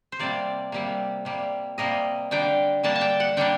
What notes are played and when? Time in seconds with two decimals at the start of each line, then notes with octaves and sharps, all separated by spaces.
0.12 C5
0.19 C3 G3 A#3 D5
0.72 C3 G3 A#3
1.25 C3 G3 A#3
1.78 C3 G3 A#3 D#5
2.31 D3 G3 A#3 D4 G5
2.83 D3 G3 A#3 D4 A5
2.96 A5
3.01 G5
3.20 F#5
3.37 D3 G3 A#3 D4 G5